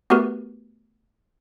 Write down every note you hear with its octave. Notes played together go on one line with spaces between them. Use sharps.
A3 B3 F#4 G4 A#4 B4